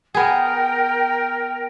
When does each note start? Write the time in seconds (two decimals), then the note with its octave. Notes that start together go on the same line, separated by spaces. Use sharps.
0.14 B3 G#4 A#4 G5